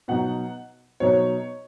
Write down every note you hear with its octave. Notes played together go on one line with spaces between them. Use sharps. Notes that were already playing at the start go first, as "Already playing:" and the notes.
B2 F#3 D#4 F#5
B2 F#3 D#4 C#5